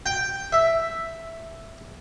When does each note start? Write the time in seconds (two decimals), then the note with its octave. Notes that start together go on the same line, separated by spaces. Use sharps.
0.06 G5
0.53 E5